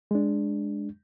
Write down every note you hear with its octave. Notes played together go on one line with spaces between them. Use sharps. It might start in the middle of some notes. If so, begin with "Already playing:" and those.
G#3 D4